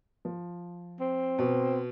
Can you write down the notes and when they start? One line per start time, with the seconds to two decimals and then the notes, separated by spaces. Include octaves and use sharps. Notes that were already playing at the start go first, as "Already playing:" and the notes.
0.25 F3
1.00 C4
1.39 B2